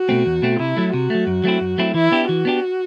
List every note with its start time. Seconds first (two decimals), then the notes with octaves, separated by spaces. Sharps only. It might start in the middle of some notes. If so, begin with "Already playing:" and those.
Already playing: F#4
0.09 B2 A3 C4
0.26 E2
0.42 B2 A3 C4
0.59 C3 E4
0.77 F#3 A3
0.94 C3 F#4
1.10 F#3 A3
1.27 F#2
1.44 F#3 A3 C4 E4
1.61 F#2
1.78 F#3 A3 C4 E4
1.94 E3 E4
2.12 B3 D4 G4
2.28 E3 F#4
2.45 B3 D4 G4